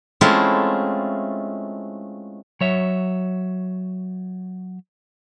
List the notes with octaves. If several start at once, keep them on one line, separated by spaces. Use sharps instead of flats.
G#3 A3 C4 C#4 E4 F4
F#3 C#5 E5